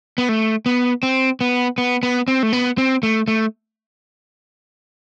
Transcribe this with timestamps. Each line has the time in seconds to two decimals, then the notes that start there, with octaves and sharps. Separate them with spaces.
0.18 B3
0.29 A3
0.66 B3
1.03 C4
1.41 B3
1.78 B3
2.03 B3
2.28 C4
2.43 A3
2.53 B3
2.78 C4
3.03 A3
3.28 A3